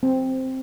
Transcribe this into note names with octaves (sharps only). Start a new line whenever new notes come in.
C4